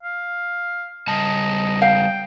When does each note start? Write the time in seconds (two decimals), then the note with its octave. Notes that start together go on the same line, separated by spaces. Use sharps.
0.03 F5
1.08 C#3 G3 D#5 A5
1.82 F5 G5